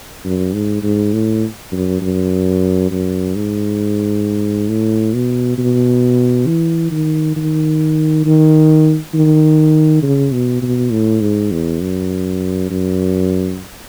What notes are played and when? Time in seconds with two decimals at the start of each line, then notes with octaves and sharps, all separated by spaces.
0.25 F#2
0.54 G#2
0.83 G#2
1.13 A2
1.72 F#2
2.02 F#2
2.91 F#2
3.36 G#2
4.69 A2
5.14 B2
5.58 B2
6.46 E3
6.91 D#3
7.36 D#3
8.25 D#3
9.14 D#3
10.03 C#3
10.33 B2
10.62 B2
10.92 A2
11.21 G#2
11.52 E2
11.81 F#2
12.71 F#2